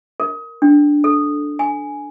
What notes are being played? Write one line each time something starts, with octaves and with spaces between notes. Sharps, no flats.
A#4
D4
A4
G#5